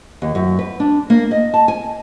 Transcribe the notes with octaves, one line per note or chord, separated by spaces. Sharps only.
D#2
F#2
B4
D4
A#3
D#5
A5
G#5